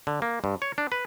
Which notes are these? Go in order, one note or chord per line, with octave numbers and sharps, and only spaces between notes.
D3
A#3
G2
C#5
D4
B4